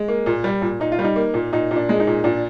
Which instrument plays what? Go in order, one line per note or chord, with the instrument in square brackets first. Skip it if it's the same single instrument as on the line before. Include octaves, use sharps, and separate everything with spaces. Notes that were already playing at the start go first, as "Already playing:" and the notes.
Already playing: [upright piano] G#3
A#3
A#2
G3
A#2
A#2 D#4
F4
G3
D#4
A#3
A#2
A#2 D#4
A#2
D4
G#3
D#4
A#2
A#2 D4